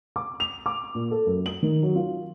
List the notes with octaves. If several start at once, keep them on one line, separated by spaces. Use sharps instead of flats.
D6
F7
D6
A#2
A4
F#2
F#7
D#3
F#3
F4